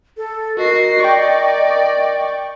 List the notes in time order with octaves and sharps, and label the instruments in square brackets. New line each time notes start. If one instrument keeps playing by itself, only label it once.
[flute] A4
[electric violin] F#4 C7 [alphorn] A#4 [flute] D#5
[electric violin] D5 [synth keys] G5 C#6